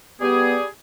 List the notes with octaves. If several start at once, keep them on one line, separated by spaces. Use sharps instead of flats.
G3 B3 G4 G#4